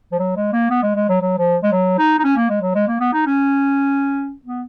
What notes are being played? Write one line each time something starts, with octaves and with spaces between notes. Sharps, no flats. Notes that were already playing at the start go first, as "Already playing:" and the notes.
F3
F#3
G#3
A#3
B3
G#3
G#3
F#3
F#3
F3
G#3
F#3
D#4
D#4
C#4
A#3
G#3
F#3
G#3
A#3
B3
D#4
C#4
B3